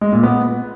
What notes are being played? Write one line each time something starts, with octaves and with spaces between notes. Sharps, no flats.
G#3
A#2
B3